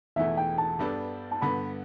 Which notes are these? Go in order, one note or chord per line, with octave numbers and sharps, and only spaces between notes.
E1 E2 E3 A3 E5
G5
A5
G2 G3 B3 D4 A4
A5
G2 D3 B3 B5